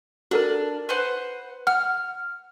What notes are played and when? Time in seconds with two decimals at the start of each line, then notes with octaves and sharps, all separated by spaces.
0.31 D4 F#4 A4 A#4
0.89 B4 C5 F#5
1.67 F#5 F6